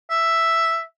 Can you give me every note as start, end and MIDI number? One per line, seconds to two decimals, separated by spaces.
0.10 0.82 76